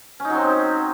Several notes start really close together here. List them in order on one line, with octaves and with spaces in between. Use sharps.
C#4 D#4 F#3 C4